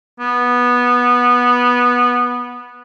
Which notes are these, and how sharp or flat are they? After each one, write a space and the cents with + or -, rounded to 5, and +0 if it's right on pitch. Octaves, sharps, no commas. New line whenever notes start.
B3 -10